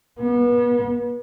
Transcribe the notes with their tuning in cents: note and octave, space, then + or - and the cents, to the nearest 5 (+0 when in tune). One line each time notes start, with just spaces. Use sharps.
B3 -30